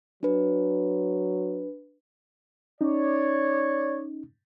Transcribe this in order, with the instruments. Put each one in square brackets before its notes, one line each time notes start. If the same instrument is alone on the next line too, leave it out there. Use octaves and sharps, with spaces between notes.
[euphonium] F#3 [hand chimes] D4 B4
[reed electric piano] C#4 D#4 [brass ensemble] C#5 D5